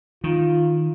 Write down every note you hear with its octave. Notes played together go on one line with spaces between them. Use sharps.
D#3 F4